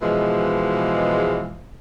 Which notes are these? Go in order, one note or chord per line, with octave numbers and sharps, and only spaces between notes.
B2 E3 F3 G#3